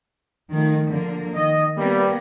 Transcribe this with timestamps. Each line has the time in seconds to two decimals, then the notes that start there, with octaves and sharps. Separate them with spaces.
0.51 D#3 F3 A3
0.89 D3 F3 A#3
1.35 D#3 D#5
1.78 G3 A#3 B3